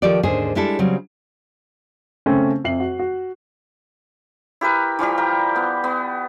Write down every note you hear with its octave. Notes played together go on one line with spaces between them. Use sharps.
D#3 F3 G4 A4 D5
D#2 G#2 D3 C#4 G#4 C5
G3 G#3 D4 E4 G4 A4
C#3 F#3 G3 C4
C#3 A3 C4 C#4
F2 E5 C7 F#7
F#4
F#4
E4 G4 A#4 B4
E3 F3 G3 G4
A#4 G5
B3
B3